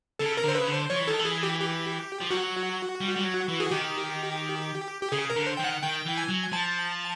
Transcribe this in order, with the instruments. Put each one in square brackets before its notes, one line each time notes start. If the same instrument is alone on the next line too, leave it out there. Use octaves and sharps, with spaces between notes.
[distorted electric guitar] C#3 [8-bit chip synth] A4
[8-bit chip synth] A#4
[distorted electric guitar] D3
[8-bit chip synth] C5
[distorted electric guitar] C#3 [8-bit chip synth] B4
[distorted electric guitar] D3
[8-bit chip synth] C5
[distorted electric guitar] F3 [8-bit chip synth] C#5
[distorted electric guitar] E3
[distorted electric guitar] D#3 [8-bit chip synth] A4
[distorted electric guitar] E3
[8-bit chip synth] G#4
G4
G4
[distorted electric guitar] F3
[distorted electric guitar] F#3 [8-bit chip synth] F#4
[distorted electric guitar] G3
G3
F#3
E3
[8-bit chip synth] G#4
[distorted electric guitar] D#3 [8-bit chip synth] G4
[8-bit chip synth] G4
[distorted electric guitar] C#3 [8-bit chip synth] G#4
[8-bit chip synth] A#4
[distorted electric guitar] D3
[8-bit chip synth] C5
[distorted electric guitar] D#3 [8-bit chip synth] G5
[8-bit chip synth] F#5
[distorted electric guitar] D#3 [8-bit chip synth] G5
[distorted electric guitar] E3
[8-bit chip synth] G#5
[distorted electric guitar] F#3
[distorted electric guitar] F3 [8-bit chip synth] A5